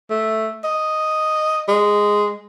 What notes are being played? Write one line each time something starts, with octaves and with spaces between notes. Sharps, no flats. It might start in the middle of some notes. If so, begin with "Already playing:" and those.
A3
D#5
G#3